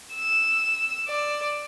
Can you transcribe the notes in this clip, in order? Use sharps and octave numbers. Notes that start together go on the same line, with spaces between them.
E6
D5